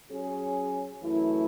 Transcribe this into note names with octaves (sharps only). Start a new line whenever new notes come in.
F#3 C#4 G#4
F#2 E3 A3 E4